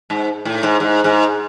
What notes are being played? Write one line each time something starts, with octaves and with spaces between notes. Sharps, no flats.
G#2
A2
G#2
G#2
G#2